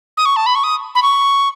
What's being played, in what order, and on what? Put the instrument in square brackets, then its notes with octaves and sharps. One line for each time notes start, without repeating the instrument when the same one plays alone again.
[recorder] D#6
C#6
A5
B5
C#6
D#6
B5
C#6